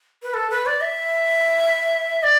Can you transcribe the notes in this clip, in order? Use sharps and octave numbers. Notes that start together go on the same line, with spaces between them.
B4
A4
B4
D5
E5
D5